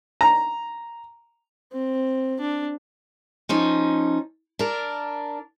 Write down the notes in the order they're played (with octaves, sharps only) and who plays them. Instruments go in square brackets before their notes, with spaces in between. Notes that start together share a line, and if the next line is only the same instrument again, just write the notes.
[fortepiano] A#5
[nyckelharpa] C4
D4
[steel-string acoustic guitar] F3 C#4 D#4
D4 A#4